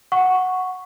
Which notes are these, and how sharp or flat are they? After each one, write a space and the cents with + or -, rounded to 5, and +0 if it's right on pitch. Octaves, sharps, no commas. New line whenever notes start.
F#5 -5 C#6 +0